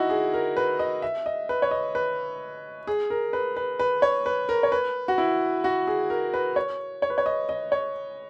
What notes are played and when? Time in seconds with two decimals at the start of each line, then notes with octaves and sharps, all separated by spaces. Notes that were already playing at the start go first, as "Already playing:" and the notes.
Already playing: D#4 E4 F#4
0.10 G#4
0.34 A#4
0.57 B4
0.79 D#5
1.02 E5
1.26 D#5
1.49 B4
1.62 C#5
1.71 D#5
1.95 B4
2.87 G#4
3.10 A#4
3.33 B4
3.56 B4
3.79 B4
4.02 C#5
4.26 B4
4.49 A#4
4.63 C#5
4.72 B4
5.08 F#4
5.18 E4
5.64 F#4
5.87 G#4
6.10 A#4
6.34 B4
6.56 C#5
7.02 C#5
7.10 B4
7.18 C#5
7.26 D#5
7.49 D#5
7.72 C#5